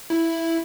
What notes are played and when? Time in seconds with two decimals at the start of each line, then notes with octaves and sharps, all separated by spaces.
0.10 E4